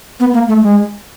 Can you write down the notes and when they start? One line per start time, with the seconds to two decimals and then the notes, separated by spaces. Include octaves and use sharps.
0.20 B3
0.34 A#3
0.48 A3
0.62 G#3